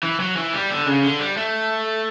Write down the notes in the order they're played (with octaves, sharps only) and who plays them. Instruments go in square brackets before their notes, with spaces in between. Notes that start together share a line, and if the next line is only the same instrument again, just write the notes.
[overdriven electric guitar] E3
F#3
E3
G3
D3
C#3
D3
G3
A3